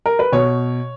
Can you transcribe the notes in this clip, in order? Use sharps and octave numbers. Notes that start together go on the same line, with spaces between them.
A#4
B4
B2 C#5